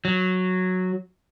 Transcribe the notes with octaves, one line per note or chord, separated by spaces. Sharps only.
F#3